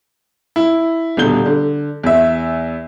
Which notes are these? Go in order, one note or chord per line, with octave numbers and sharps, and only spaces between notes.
E4
D#1 B2 D3 G6 G7
D3
E2 E5